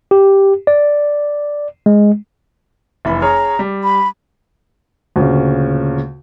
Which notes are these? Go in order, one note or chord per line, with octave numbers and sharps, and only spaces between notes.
G4
D5
G#3
F1 E3 B5
G#4 C#5 A#5 F6
G3
B5
D2 A#2 C#3